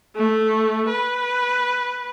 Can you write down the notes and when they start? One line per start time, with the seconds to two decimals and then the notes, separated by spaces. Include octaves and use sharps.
0.16 A3
0.89 B4